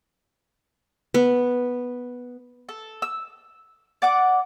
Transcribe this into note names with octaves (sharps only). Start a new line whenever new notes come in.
B3
A4
E6
D5 F#5 D6